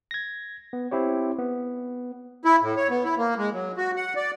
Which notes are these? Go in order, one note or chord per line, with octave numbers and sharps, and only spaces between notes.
G#6 A#6
B3
C4 E4 G4 C#5
B3
E4
A2
C#5
B3
E4
A#3
G#3
F#3
F#4
F#5
D5